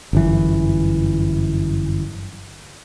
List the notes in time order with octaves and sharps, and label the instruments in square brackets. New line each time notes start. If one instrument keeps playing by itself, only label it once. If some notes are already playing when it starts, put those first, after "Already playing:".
[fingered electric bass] G1 F#2 E3